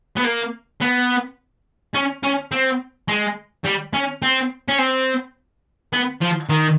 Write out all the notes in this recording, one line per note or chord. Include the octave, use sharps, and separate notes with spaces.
B3
A#3
B3
C#4
C#4
C4
G#3
G3
C#4
C4
C#4
C4
B3
F3
D#3